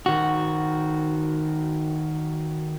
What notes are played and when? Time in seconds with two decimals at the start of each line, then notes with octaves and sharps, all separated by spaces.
0.06 D#3 F#4